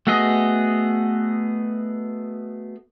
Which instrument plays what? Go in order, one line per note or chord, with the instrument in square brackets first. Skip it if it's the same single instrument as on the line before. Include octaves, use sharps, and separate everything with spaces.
[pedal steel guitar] A3 B3 F#4 G#4 D#5